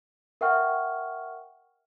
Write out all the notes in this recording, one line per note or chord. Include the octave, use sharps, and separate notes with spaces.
A#4 E5 F#5 G5 C#6 F6